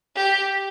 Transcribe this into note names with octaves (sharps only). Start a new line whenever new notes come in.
G4